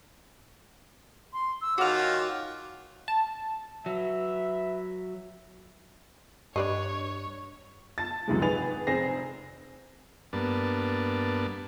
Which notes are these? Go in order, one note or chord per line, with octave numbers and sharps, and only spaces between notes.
C6
E6
D#3 C#4 F4 F#4 D6 F6
A5
F#3 B4 E5
G2 D4 G4 B4 C#5 D#5
A5 A6
C#2 F#2 C3 D#3 F3 G#3
G#1 D#3 G#4 B4 A6 F7
F1 C4 G#4 A#6 C7
G2 A#3 B3 D4 A5